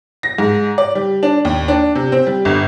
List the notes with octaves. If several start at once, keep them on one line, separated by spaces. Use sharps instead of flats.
A#6
G#2
D5
G3
D4
D#2
D4
C3
C4
G3
G1